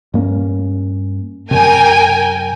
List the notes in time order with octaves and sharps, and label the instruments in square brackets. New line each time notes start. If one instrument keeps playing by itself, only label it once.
[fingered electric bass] G2 A#3 C#4
[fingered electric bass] F#2 C3 [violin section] A#4 G5 G#5